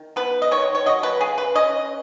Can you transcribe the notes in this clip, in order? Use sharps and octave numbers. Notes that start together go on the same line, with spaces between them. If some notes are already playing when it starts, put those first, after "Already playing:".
Already playing: D#3
B3 B4
D#5
D#3 C#5
C#5
F#3 D#5
B4
C#3 G#4
B4
C#4 D#5